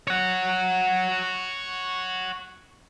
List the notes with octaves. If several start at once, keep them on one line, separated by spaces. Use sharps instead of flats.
C#5 F#5